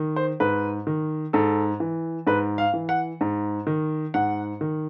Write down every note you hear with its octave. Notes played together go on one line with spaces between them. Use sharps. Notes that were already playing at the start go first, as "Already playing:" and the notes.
Already playing: D#3
C5
G#2 B4
D#3
G#2 A4
E3
G#2 B4
F5
E3
F#5
G#2
D#3
G#2 F#5
D#3